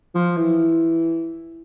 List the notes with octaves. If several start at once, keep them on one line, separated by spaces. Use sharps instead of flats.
F3
E3